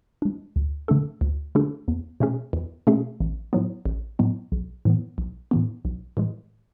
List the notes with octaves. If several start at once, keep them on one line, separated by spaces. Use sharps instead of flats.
G#3 D4
D2
D3 A3 D4 A4
D2
D3 A3 D4 A4
E2
B2 A3 C#4 G#4
E2
B2 A3 C#4 G#4
A1
A2 F#3 B3
A1
A2 F#3 B3
B1
A2 E3 B3
B1
A2 E3 B3
B1
A2 E3 G#3